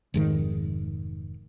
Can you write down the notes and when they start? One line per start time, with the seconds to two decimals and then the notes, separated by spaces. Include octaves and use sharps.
0.14 F1 G#2 D#3